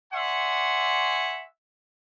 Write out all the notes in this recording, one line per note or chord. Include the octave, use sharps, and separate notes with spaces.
D5 E5 F#5 G#5 C6 C#6